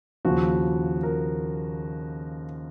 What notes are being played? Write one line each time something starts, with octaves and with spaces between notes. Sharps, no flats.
D#2 C#3 F3 F#4
A#4